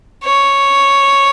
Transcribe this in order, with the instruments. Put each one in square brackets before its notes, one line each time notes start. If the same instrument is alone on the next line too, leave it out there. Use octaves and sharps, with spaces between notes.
[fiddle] C#5